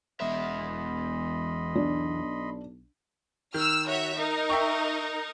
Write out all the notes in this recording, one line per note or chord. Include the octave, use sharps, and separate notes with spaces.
E1 E2 D#5 E5 B5 C6
B1 D4
D#3 E6 F6
F#4 C#5 E5
D#4 A#4
E5 G5 C#6